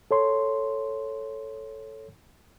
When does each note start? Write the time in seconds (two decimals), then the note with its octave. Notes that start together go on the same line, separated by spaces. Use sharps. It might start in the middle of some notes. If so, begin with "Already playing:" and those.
0.11 A4 C#5 C6